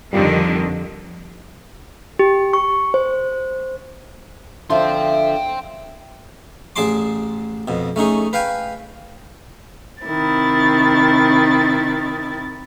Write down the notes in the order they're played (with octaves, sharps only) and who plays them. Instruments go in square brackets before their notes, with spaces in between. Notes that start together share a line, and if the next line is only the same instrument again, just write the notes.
[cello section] F2 D3 D#3 [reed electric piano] G3 F4 G4
[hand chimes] G4
C#6
C5
[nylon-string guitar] D3 F3 A4 [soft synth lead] E5 [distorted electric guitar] G5 C6
[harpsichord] A1 G#4 D5 A5 C6 D6
F2 B2
A3 C#4 D#4 G#4
B4 F5 G5 G#5
[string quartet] C3 D#3 E4 A6